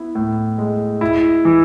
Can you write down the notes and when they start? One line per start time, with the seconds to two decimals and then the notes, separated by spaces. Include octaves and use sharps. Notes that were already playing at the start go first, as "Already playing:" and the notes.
Already playing: B3 E4
0.15 A2
0.58 G#3
1.01 E4
1.45 E3